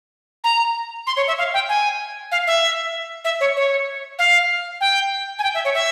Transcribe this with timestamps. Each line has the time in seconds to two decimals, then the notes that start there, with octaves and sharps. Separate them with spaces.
0.44 A#5
1.07 C6
1.17 C#5
1.27 E5
1.38 F5
1.54 G5
1.69 G#5
2.32 F5
2.47 E5
3.25 E5
3.41 C#5
3.57 C#5
4.19 F5
4.81 G5
5.39 G#5
5.44 G5
5.54 E5
5.65 C#5
5.74 E5